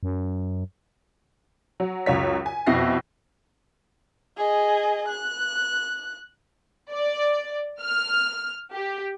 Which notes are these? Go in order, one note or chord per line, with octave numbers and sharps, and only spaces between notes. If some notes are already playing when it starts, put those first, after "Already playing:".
F#2
F#3
C#2 F#2 C#5 B6
G#5
F2 B2 E4 A#6 C7
G#4 D#5
F#6
D5
F6
G4